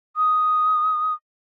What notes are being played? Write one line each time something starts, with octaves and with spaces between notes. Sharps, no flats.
D#6